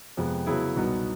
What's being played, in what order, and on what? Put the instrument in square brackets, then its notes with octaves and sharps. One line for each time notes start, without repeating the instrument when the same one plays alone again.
[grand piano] F2 C3 F3 G#3 B3
C#3 F#3 B3 E4 G#4
C2 B2 F#3 B3 D#4